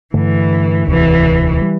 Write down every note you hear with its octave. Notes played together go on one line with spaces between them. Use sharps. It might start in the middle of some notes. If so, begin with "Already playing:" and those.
G2 D3 E3 A3
E1 D2 C3 E3
G3